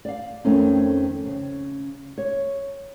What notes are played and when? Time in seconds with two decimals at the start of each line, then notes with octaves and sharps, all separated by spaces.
0.05 D5 F5
0.45 F2 D#3 A3 C4 C#4
1.26 C#3
2.18 C#5